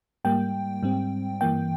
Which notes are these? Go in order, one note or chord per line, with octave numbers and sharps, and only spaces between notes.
G#2 G3 A#3 G5
G#2 G3 C4
G2 E3 A#3 G5